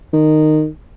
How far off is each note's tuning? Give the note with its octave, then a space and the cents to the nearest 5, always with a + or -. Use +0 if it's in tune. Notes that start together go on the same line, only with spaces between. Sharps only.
D#3 -15